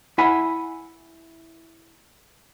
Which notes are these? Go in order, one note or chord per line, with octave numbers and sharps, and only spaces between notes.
E4 F#5 G#5 B5